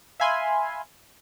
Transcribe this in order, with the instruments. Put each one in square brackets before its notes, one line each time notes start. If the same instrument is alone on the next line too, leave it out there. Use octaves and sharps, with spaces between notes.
[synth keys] E5 F5 G#5 B5 C6